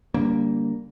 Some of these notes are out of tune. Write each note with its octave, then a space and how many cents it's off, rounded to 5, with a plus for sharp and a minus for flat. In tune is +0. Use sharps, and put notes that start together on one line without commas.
D3 -30 G3 +0 A#3 +0